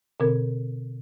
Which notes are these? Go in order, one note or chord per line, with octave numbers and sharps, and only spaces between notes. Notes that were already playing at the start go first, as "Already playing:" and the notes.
B2 D3 C4 A#4